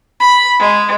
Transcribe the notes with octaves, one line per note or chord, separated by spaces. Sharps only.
B5
G#3